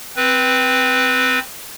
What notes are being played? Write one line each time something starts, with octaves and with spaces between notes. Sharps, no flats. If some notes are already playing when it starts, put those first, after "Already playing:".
C4 B4